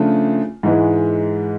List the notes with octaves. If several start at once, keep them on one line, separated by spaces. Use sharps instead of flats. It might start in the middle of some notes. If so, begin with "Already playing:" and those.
Already playing: C#3 F3 A3 D4 F4
G#2 E3 G#3